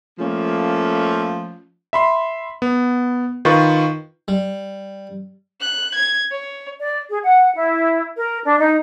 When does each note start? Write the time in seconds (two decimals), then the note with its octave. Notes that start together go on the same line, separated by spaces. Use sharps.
0.19 F3 A3 A#3 C#4
1.93 E5 B5 C6
2.62 B3
3.45 D#3 F4 B4 C#6
4.28 G3
5.61 F#6
5.95 G#6
6.31 C#5
6.79 D5
7.10 G#4
7.23 F#5
7.55 E4
8.16 A#4
8.43 D4
8.59 D#4